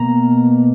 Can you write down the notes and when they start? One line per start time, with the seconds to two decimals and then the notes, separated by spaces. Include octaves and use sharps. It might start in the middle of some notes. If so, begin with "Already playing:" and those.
Already playing: B2 A#3 A#5